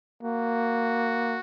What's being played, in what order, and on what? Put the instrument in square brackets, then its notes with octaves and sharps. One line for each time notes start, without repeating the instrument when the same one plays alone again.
[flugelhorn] A#3 [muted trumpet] F#4